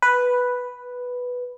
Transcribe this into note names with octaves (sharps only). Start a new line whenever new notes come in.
B4